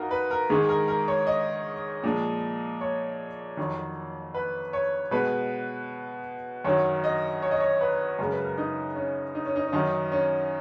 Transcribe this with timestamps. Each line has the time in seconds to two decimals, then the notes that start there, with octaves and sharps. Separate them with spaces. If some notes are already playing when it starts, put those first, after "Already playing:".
Already playing: F2 D#4 F4 F#4 A#4
0.11 B4
0.31 A#4
0.50 G#2 D#3 G#3 G#4
0.69 A#4
0.88 A#4
1.08 C#5
1.27 D#5
2.04 A#2 F3 G#3
2.81 C#5
3.57 F2 D#3 F#3
4.34 B4
4.73 C#5
5.11 B2 G#3 B4
6.65 F#2 D#3 F#3 C#5
7.04 D#5
7.42 C#5
7.51 D#5
7.60 C#5
7.81 B4
8.19 F#2 C#3 G#3 A#4
8.32 B4
8.45 A#4
8.58 D#4
8.96 C#4
9.35 D#4
9.46 C#4
9.56 D#4
9.67 C#4
9.72 F#2 D#3 F#3 D#4
10.12 C#4